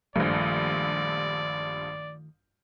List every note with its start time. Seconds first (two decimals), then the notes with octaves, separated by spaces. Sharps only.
0.16 A#1 G2 D#3 F3 A3 D5